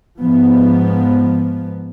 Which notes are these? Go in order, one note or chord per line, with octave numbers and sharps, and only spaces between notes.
G#2 F3 B3